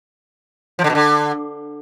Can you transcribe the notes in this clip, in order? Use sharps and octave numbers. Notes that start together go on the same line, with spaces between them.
F3
D3
B2
D3